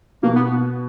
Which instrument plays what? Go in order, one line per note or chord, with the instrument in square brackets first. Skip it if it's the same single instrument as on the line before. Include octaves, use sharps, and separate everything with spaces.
[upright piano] B2 [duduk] A#3
[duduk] B3